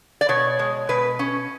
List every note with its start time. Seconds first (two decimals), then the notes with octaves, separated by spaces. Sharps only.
0.21 D5
0.29 B2 C#5
0.59 G#3
0.89 B2 B4
1.19 C#4